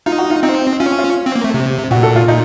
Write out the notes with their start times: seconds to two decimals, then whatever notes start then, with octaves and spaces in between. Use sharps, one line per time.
0.06 D#4 F4
0.19 F#4
0.31 F4
0.43 C4 D#4
0.80 C#4 F4
0.99 F4
1.26 C4
1.35 A#3
1.44 A3
1.54 C3
1.91 A#2 F#4
2.03 A4
2.16 F4
2.28 A#2 D#4